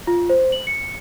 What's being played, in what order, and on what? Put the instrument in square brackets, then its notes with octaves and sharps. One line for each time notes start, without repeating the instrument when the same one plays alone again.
[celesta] F4
C5
F#7
C#7